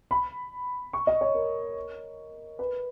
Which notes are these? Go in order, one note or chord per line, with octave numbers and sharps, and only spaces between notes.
B5
C#6
D#5
C#5
A#4
B4